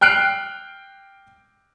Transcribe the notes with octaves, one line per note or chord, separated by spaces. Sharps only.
G5 F6 F#6 C7 D7